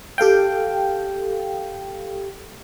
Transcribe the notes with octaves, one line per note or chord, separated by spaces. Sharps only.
G4 A4 F5 G5